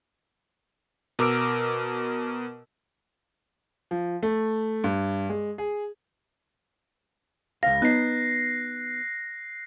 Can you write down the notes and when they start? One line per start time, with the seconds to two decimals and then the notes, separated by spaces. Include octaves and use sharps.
1.19 B2 A#4 D6 E6 D7
3.91 F3
4.23 A3
4.84 G2
5.30 G#3
5.58 G#4
7.63 C#2 F5 A#6
7.82 B3 D#4 F#6 C7